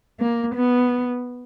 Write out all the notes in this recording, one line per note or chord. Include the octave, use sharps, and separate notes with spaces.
A#3
B3